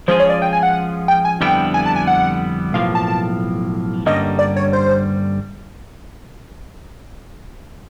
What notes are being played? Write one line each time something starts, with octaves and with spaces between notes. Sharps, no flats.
F3 G#3 C#4 F4 G#4 C5
C#5
D5
G5
G#5
F#5
G5
G#5
F2 D3 G3 B3 E4 G5
G#5
A5
G#5
F#5
B1 A2 F3 A#3 F5
A5
A5
G2 D3 G3 A#3 C#4 D#5
D5
C#5
C5